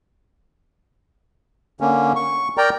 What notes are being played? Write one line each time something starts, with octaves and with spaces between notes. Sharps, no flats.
D3 A#3 C#4
C#6
A#4 D5 G5 A#5